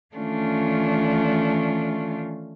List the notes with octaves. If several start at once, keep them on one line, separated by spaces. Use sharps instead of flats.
D#3 E3 A3 C#4 D4 F4